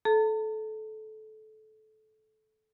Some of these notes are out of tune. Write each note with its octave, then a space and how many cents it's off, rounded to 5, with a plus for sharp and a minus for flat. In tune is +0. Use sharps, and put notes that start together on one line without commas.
A4 -20 A5 +45